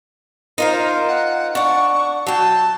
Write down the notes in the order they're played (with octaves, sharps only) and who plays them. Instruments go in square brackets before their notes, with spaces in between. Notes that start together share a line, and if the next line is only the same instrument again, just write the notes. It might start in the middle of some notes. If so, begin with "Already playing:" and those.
[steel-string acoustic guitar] D#4 F4 C5 [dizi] A#4
[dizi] F#5
[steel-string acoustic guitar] D4 F#5 [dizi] C#6
[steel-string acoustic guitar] F#3 G5 [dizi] A5